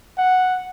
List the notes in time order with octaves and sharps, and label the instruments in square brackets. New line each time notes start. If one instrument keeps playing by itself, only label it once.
[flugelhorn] F#5